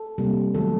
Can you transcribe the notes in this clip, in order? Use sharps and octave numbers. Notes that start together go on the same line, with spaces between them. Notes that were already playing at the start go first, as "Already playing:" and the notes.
Already playing: A4
C3 G3 A#3
D#3 F#3 A3 C4 A4